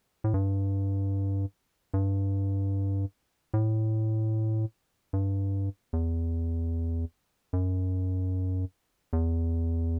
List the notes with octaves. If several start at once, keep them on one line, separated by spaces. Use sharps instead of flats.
A2
G2
G2
A2
G2
E2
F#2
E2